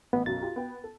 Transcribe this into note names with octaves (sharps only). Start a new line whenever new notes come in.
A1 B3
B1 F#2 A6
F4 G4
B3 G5
A4